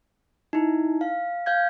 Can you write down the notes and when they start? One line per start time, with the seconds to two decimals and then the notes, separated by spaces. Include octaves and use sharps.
0.53 D#4 E4
1.01 F5
1.46 F5 G6 G#6